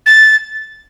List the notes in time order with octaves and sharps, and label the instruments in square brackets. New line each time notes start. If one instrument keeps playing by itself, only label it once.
[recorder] A6